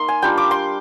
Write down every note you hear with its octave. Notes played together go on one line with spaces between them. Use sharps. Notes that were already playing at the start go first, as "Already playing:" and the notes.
Already playing: A#3 D#4 C6
G#5
G3 D4 F4 G5
D6
C6